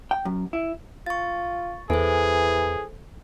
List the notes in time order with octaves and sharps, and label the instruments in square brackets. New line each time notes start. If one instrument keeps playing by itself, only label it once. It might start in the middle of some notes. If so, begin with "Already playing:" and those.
[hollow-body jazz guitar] G5
F#2
E4
[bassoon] F4 [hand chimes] C#6 A6
[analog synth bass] E2 [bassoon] E3 [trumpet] G#4 [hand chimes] A4 C5